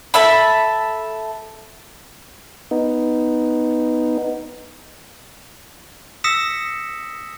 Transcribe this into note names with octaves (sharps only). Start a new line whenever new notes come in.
A4 E5 B5
B3 D#4
D#6 E6 A#6 B6 C#7 E7